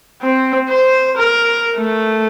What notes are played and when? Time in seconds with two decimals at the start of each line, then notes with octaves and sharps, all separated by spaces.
0.22 C4
0.69 C5
1.17 A#4
1.76 A3